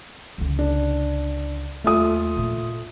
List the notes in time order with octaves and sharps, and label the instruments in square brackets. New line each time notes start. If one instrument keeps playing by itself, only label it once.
[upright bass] C#2 D3
[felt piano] D4
[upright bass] D#2 [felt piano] A3 F4 D#6
[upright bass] A#2 A#3